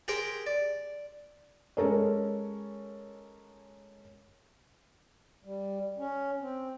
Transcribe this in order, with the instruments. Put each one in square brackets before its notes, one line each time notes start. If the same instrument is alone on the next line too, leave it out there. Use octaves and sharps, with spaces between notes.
[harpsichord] G4 G#4 A#4 C5 G5
D5
[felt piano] G#3 C#4 A4 A#4 C#5
[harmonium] G3
C#4
C4